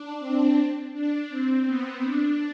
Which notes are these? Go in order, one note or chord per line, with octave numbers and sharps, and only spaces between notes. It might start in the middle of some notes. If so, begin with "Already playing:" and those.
Already playing: D4
C4
D4
C4
B3
D4